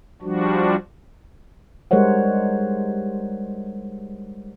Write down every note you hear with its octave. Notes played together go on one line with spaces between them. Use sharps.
F3 G3 D4 F#4
G3 G#3 A#4 C5 C#5 F#5